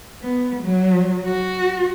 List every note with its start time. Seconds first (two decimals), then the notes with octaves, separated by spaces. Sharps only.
0.23 B3
0.62 F#3
1.25 F#4